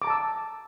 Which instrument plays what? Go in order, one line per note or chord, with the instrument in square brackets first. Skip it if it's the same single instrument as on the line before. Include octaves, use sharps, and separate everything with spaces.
[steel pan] D6
A#5
A5
E6